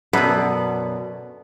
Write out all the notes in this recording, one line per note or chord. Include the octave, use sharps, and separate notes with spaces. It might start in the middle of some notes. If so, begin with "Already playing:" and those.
F#2 B2 D3 B4